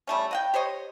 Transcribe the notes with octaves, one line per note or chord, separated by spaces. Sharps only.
G3 A3 C#4
D#5 F#5 G5
G4 C5 C#5 D#5